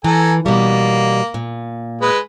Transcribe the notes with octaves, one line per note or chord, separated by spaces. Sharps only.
E3 A4 G#5 A#5
B2 G3 A#3
A#2
G#3 B4